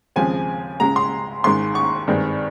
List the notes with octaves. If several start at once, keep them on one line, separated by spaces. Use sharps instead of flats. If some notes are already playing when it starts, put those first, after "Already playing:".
D#2 C#3 F3 G#3 C4 G#5
C#2 C#3 G#3 A#5
C6
G#1 G#2 D#3 G#3 C6
C#6
G2 D#3 G#3 C4